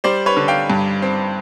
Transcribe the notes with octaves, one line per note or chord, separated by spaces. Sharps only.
G3 C5 D5
B4 C#5
D3
F5 G5
G2
C4